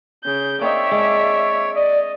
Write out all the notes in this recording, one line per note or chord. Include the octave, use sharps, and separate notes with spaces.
C#3 G6
A#3 C4 D#4 C#5 D5 E5
G#3 D4
D5 D#5